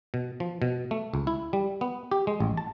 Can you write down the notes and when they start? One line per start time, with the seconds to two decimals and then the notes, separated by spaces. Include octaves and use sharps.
0.14 B2
0.40 F3
0.62 B2
0.91 A3
1.14 C#2
1.27 E4
1.53 G3
1.81 B3
2.12 G4
2.27 G#3
2.40 A1
2.57 A5